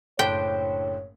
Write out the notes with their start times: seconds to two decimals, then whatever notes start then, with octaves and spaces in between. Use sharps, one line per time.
0.19 F#1 A2 D4 G4 A4 C5 C#5 G5